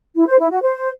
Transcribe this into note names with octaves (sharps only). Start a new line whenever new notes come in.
E4
C5
E4
F#4
C5